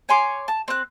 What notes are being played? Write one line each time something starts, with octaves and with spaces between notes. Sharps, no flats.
C#5 G#5 C6 D6
A5
C4 F#6